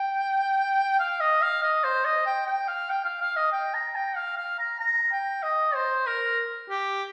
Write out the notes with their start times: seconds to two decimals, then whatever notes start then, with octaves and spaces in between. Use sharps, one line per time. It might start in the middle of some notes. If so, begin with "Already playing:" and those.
Already playing: G5
0.99 F5
1.20 D#5
1.42 F5
1.63 D#5
1.84 C5
2.05 D#5
2.26 G5
2.46 G5
2.68 F5
2.90 G5
3.04 F5
3.21 F5
3.36 D#5
3.52 G5
3.74 A#5
3.95 G5
4.16 F5
4.37 F5
4.59 A#5
4.79 A#5
5.11 G5
5.43 D#5
5.74 C5
6.06 A#4
6.70 G4